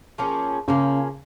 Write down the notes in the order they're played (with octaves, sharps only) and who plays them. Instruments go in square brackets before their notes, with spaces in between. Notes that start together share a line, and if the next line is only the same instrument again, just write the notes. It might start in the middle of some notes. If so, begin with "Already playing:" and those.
[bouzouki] F3 A#3 C#4 G#4
[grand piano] C#3 [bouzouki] F3 A#3 C#4 G#4